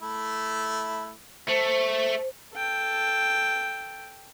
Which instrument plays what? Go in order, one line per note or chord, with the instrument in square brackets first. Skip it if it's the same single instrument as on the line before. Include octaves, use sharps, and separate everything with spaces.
[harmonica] A3 E4
[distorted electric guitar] A3 [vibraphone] C5
[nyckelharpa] A4 G5